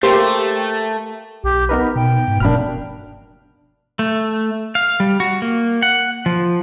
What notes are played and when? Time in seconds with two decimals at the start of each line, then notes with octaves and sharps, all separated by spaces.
0.03 A3 A#3 G4 C5
1.44 B1 G4
1.69 B3 D#4 A#4 B4
1.96 B2 G5
2.28 G#2
2.40 F1 B2 A#3 D4 B5 F6
3.99 A3
4.75 F5
5.00 G3
5.20 F#4
5.42 A#3
5.82 F#5
6.26 F3